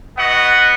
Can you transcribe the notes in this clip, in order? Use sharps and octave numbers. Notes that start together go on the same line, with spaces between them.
B3 F#4 D#5 F#5